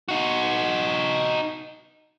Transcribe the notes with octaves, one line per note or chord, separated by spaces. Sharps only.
D#4 F#4